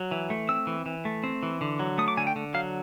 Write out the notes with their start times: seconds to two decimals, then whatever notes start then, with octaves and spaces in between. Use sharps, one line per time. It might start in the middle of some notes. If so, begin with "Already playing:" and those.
Already playing: F#3
0.11 E3
0.30 A3
0.49 C4 E6
0.67 E3
0.86 E3
1.05 A3
1.24 C4
1.43 E3
1.61 D3
1.80 F#3
1.98 A3 D#6
2.08 D6
2.17 D3 G#5
2.27 G5
2.36 D3
2.54 F#3 F5